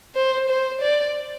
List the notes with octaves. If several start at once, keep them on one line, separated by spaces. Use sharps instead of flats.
C5
C5
D5